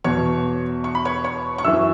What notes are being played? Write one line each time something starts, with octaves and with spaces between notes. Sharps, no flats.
E2 B2 C#5 C#6
C#6
B5
C#5 C#6
C#5 C#6
C#6
F#2 E3 E5 E6